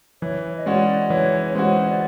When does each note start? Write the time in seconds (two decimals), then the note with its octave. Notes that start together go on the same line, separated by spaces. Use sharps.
0.22 E3 C#5
0.57 D#5
0.66 G#3 C#4 F#4 D5
1.10 E3 C#5
1.50 C#5
1.55 G#3 C#4 F#4 C5
1.90 D5